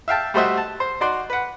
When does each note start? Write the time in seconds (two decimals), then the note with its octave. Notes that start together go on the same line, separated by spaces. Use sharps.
0.08 E5 F5 G5 A5
0.34 G3 A3 F#4 C5 D#5 E5
0.57 A5
0.80 C5
1.01 D#4 F#4 D5 C6
1.30 B4 F#5